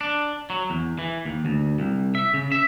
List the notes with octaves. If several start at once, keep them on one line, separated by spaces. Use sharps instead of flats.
D4
F#3
E2
E3
D#2
D2
C2
E5
C#3
E5